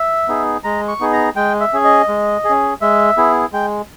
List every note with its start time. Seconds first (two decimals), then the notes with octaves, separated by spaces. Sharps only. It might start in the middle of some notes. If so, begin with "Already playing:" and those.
Already playing: E5
0.28 B3 D#4 G#4
0.64 G#3 A#5
0.88 C#6
1.00 B3 D#4 G#4
1.13 A#5
1.36 G#3 G5
1.60 E5
1.73 C#4 G#4
1.84 D#5
2.08 G#3
2.45 G#4
2.50 C#4
2.81 G#3 E5
3.17 B3 E4 G#4
3.53 G#3 G5